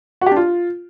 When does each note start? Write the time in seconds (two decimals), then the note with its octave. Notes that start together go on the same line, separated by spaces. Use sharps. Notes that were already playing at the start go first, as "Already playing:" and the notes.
0.21 F#4
0.26 G4
0.32 D4
0.37 F4